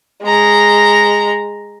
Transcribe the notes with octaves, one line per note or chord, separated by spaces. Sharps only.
G#3 A#5